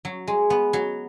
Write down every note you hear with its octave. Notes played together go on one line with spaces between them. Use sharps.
F#3
G#3
B3
F#3